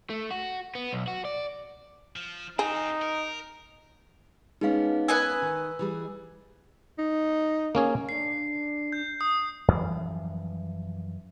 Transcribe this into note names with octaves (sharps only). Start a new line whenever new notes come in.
A3
F#4
B3
B1
F#4
D5
F3
C4 D#4 F4 G#4
A#4
G#3 B3 C#4 D#4 G#4 F5
B4 D#5 G#5 E6
D#3
E3 G3 G#4
D#4
A#3 C#4 G#4
D4 C7
G6
D#6
F#2 E3 F3 G3